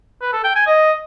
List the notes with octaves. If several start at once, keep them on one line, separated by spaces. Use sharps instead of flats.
B4
A4
G5
G#5
D#5